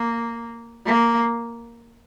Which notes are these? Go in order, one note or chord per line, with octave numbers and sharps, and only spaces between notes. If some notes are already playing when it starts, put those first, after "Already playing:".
Already playing: A#3
A#3